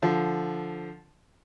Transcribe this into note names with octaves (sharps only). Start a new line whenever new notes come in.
D3 F3